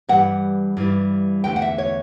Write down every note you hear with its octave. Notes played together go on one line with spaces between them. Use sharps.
G2 E3 G3 F#5
G2 E3 G3
E2 D3 F#3 A3 G5
F#5
E5
C#5